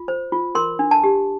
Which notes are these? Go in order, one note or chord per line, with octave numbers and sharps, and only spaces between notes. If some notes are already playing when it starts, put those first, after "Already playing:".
Already playing: F4
C5
F4
A#4 C6
D4
A5
G4